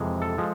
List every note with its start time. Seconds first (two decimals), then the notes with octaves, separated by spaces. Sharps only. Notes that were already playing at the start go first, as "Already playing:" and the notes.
Already playing: F2 C3 E3 G#3
0.22 A4
0.38 F3 G#3